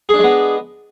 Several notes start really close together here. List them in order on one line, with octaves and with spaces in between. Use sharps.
G#4 D4 G#3 B3